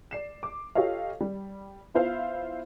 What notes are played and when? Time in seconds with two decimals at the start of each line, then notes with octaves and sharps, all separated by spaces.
0.11 D5 C7 E7
0.43 D6
0.75 F4 G4 A4 C#5 D#5 F5
1.20 G3
1.94 B3 E4 F4 C5 E5 F5